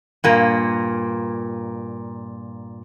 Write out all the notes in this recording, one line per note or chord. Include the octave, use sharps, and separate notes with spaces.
G2 A#2 A#3